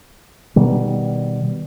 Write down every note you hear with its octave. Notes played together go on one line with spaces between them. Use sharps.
B2 D#3 G3